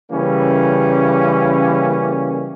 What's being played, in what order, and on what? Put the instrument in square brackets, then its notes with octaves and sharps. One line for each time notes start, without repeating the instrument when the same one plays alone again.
[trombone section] C#3 E3 G3 A#3 C#4